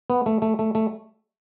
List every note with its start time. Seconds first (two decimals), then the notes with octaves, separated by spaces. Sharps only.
0.10 B3
0.26 A3
0.42 A3
0.59 A3
0.75 A3